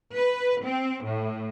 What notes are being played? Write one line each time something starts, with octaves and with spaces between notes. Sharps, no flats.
B4
C4
A2